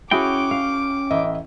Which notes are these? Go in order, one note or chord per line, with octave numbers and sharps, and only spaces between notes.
C#4 E4 F#4 G#4 G5 D6
F5
A1 D#5 E5